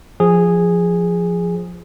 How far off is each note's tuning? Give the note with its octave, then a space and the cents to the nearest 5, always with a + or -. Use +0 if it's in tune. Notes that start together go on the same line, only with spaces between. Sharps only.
F3 +0 G#4 -5